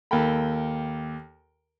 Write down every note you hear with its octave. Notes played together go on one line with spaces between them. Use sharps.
D#2 A4 A#4 G5 B5